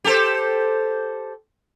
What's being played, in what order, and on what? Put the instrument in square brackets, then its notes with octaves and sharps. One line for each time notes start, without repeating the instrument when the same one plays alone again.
[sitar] G4 A4 C5